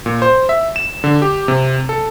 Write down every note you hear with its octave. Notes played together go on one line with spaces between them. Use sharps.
A#2
C5
E5
E7
D3
G4
C3
A4